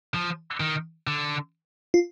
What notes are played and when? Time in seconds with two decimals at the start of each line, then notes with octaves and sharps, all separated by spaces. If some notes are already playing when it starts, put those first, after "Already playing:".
0.14 F3
0.60 D#3
1.07 D3
1.94 F4